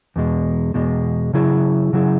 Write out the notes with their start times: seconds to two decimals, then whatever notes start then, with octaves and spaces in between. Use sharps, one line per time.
0.16 E2 B2 G#3
0.74 E2 B2 G#3
1.33 C#3 F#3 E4 G#4
1.93 C#3 F#3 E4 G#4